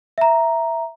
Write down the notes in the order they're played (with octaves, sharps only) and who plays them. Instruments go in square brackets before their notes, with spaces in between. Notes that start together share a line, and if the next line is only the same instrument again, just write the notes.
[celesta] E5 A#5